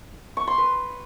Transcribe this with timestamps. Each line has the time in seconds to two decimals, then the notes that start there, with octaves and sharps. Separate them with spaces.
0.37 C#6
0.47 C6
0.58 B4